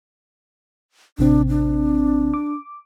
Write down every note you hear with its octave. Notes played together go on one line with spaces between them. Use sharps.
A1 C3 C4 D4
D4
D6